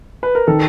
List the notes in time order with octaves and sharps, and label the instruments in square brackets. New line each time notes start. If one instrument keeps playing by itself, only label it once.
[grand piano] B4
A#4
[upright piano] D#3 [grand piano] A4